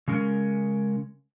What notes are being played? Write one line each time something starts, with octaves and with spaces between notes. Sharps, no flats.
C#3 G#3 C#4 A#4